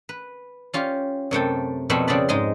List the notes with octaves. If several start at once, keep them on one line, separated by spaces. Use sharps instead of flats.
B4
C#4 F4 G4
F#2 C3 A3 G5
F2 B2 A3 C4 G#5 B5
C#3 C4 G#4 D5 B5
G#2 G#3 D#5 C6